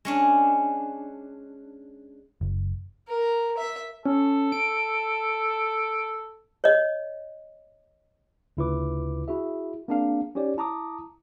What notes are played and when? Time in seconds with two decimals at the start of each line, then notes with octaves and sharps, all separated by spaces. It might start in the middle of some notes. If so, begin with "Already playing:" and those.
0.05 G#3 C#4 D4
2.41 F#1
3.08 A#4
3.57 E5
4.06 C#4 A4
4.52 D7
6.64 C#5 D#5
8.57 D2 C#3 E4 F4 B4 D6
9.28 E4 F#4 G#4 E5
9.88 A#3 C4 D4 G#4 F5
10.35 C#4 D#4 G4 C#5 D5
10.57 E4 A5 A#5 D6 D#6